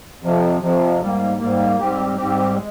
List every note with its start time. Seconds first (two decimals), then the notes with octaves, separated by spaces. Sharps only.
0.21 F2 C3 F3
0.60 F2 C3 F3
1.00 G#2 G3 A#3
1.39 G#2 G3 A#3
1.78 G#2 G3 C4 G4
2.16 G#2 G3 C4 G4
2.55 G#3